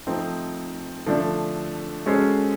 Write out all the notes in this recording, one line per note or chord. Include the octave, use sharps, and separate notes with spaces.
F3 A3 C4 D#4
D3 F3 A3 D4
G#3 C#4 F#4 A4 C5